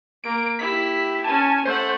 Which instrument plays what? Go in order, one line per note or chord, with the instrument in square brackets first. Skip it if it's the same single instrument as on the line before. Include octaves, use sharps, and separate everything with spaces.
[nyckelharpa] A#3 [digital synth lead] D7
[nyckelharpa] E4 G4 [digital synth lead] B6
[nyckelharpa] C#4 G#5 [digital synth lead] A5
[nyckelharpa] A3 F#5 [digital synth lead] C5